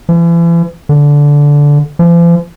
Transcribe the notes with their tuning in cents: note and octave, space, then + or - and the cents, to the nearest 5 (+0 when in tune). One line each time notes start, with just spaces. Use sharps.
E3 +40
D3 -15
F3 -45